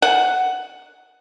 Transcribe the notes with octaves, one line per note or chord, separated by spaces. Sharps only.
F#5